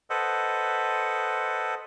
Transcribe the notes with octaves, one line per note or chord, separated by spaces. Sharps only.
A4 B4 C5 D#5 F#5